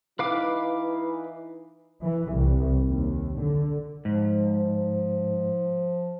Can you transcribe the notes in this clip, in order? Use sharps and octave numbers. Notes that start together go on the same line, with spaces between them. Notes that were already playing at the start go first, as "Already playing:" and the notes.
E3 D#4 B4 F5 D6
E3
C2
D#2
D3
G#2 F3